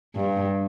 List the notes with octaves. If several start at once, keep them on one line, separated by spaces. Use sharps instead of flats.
G2